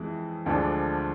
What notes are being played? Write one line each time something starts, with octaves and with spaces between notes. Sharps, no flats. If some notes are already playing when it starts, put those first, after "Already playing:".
Already playing: F2 E3 G#3
D2 D3 F3 G#3 D4